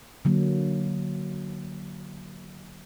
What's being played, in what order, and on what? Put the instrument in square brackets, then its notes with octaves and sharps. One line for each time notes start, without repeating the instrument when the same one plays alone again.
[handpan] D3 F#3 A#3